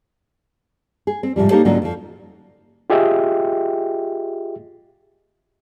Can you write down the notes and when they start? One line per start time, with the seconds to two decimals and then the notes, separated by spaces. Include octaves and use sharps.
1.07 G#4
1.23 C4
1.36 G#2 C3 F3 G3
1.50 A#3 D#4 G4 A4 C5 C#5
1.65 G#2 D3 F#3 A#3 C#4 F4
1.82 F2 F3
2.90 F4 G4 G#4 D#5 E5 G5